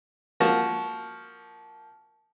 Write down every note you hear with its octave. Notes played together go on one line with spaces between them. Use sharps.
F3 A#3 F#4